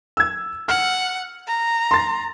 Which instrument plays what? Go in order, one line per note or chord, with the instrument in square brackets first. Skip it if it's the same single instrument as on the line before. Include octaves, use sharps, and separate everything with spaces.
[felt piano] E6 G#6
[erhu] F#5 [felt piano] F6
[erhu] A#5
[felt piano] C6 A6